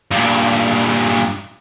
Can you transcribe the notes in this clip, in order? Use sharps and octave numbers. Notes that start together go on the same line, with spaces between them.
G2 A#2